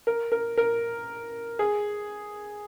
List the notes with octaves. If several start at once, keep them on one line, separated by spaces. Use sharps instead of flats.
A#4
A#4
A#4
G#4